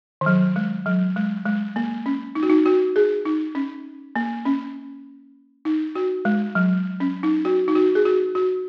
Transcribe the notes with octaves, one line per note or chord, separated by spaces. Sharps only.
D#3
F#3
G#3
F#3
G#3
G#3
A#3
C#4
D#4
F#4
D#4
F#4
G#4
D#4
C#4
A#3
C#4
D#4
F#4
G#3
F#3
C#4
D#4
F#4
D#4
F#4
G#4
F#4
F#4